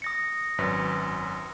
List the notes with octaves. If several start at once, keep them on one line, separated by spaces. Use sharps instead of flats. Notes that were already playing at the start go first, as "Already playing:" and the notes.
D#6 A#6 C#7
G#1 F#2 B4